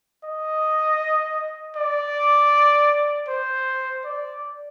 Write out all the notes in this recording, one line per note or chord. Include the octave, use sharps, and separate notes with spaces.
D#5
D5
C5
D5